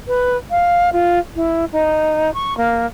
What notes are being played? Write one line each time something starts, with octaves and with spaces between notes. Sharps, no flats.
B4
F5
F4
E4
D#4
C#6
A#3